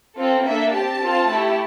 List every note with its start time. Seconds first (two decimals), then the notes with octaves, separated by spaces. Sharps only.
0.18 C4 F4 A4
0.47 A#3 D4 A4 E5
0.74 C4 G4 A5
1.03 C4 F4 A4
1.31 A3 E4 G4